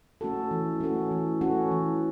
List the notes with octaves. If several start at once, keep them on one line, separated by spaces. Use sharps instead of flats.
A3 C#4 F#4 A4
E3
A3 C#4 F#4 A4
E3
A3 C#4 F#4 A4
E3